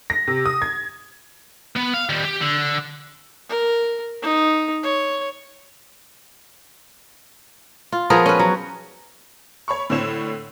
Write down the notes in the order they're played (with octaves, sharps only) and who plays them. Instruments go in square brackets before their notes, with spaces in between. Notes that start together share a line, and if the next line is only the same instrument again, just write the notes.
[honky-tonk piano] A#6
C3
D#6
G#6
[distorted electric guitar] B3
F5
D#3 G3
G4
D3
[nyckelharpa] A#4
D#4
C#5
[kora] F4
F3 B3 G#4 A#4
C#4 B4
F#3
[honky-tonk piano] C#5 B5 C#6
A2 D3 C4 C#5 E7